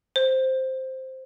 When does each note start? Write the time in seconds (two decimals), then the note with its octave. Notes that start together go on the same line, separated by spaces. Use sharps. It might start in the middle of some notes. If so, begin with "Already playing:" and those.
0.16 C5